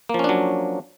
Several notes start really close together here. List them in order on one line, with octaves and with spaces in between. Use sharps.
A#3 F3 C#4 D4 F#3